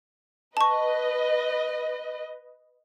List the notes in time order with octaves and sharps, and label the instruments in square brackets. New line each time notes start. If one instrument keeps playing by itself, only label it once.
[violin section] B4 D#5 [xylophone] A5 C#6